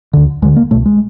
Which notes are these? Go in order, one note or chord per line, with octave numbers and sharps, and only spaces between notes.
D2 D3
D2 D3 G#3
A#3
C2 B2 A3
G#3